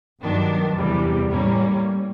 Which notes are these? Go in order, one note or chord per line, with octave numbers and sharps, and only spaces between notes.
G2 D#3 F#3 B3 D4
E2 C3 E3 G3
A2 E3 G3 A#3 C#4